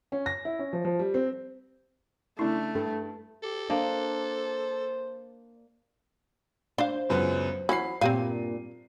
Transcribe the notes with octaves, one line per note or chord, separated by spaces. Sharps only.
C#4
A#6
E4
C#4
F3
F3
G3
C4
C#3 A3 D4 E4 C#6
G2 A4
G4 A4
A#3 D4 C5 D#5
D4 C5 F5
C#2 F#2 B3
E3 F#3 C#4 B5 C7
G2 A#2 C4 G4 F5 D#7